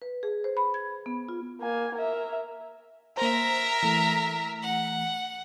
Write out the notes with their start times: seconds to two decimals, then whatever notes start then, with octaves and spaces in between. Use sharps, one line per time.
0.02 B4
0.23 G#4
0.44 C5
0.57 B5
0.74 G#6
1.06 B3
1.29 F4
1.61 A#3 G#5
1.95 A#4 E5
3.17 A#3 A#4 C5 E5 A#5
3.83 E3 A3
4.62 F#5